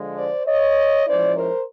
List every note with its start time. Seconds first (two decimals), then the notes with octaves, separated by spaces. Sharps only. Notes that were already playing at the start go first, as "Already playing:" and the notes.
Already playing: D3 F3 G#3
0.17 C5 D5
0.46 C#5 D#5
1.06 F3 G#3 C#4 E4 C5 D5
1.36 A#4 C5